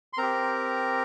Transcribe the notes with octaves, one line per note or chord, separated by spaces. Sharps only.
C6
C4 G4 A#4 A#5